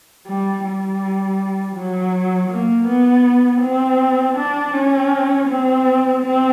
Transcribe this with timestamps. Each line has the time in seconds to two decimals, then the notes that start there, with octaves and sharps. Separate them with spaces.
0.27 G3
0.65 G3
1.76 F#3
2.50 A#3
2.88 B3
3.62 C4
4.36 D4
4.73 C#4
5.48 C4
6.22 C4